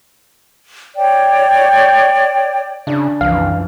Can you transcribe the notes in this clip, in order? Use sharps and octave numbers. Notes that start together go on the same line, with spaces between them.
C#5 D5 G5
C#3 D4
C2 F#2 E3 F3 F5